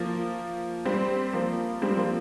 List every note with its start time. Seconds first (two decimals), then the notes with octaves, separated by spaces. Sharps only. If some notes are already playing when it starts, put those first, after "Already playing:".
Already playing: F3 A#3
0.86 G3 C4
1.33 F3 A#3
1.82 G3 C4
1.97 F3 A#3